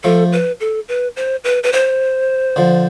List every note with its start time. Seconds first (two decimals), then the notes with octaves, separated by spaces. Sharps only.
0.04 F3 A3 A4
0.32 B4
0.60 A4
0.88 B4
1.16 C5
1.44 B4
1.63 B4
1.73 C5
2.56 D3 F3